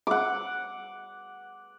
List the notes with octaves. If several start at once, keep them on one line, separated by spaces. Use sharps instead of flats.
F#5 D6